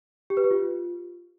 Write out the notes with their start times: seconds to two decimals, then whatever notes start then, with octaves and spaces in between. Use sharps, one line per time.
0.30 G4
0.37 B4
0.44 G4
0.51 F4